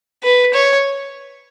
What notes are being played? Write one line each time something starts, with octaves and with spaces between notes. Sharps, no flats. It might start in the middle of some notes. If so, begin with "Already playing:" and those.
B4
C#5